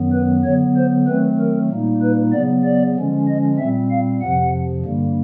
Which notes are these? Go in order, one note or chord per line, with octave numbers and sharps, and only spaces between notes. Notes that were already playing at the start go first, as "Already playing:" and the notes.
Already playing: F#2 D#3 F#3 B3
B4
D3 F#3 B3 C#5
C5
D#3 F#3 A3 C4 B4
A#4
A#2 G3 A#3 D#4
B4
C#3 F#3 B3 D5
D5
D3 F3 G#3 C#4
D#5
A#2 G3 C4 E5
F5
F2 C3 F3 F#5
G2 D3 G3 A#3